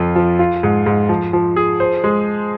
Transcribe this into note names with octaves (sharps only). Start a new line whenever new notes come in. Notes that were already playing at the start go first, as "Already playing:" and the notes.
Already playing: F2 F4
F3
F4
G#2
G#2
F3
F3
G#4
C5
G#3